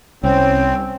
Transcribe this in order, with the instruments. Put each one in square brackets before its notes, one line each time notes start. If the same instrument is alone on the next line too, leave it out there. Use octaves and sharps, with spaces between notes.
[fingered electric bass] C2 [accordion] C4 [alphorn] C#4